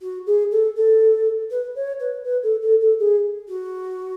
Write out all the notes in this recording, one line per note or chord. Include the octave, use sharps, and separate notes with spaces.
F#4
G#4
A4
A4
B4
C#5
B4
B4
A4
A4
A4
G#4
F#4